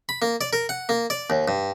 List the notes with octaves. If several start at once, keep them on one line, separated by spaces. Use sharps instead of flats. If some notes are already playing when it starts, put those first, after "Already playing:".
B5
A#3
D5
A#4
F#5
A#3
D5
D#2
G2